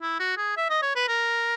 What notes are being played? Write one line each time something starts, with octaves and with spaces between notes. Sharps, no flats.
E4
F#4
G#4
E5
D#5
C#5
B4
A#4